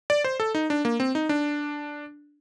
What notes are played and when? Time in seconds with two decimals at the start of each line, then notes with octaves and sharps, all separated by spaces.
0.10 D5
0.24 C5
0.40 A4
0.55 D#4
0.70 D4
0.85 A#3
1.00 C4
1.15 D#4
1.29 D4